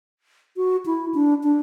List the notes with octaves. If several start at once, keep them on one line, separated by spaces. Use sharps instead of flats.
F#4
E4
D4
D4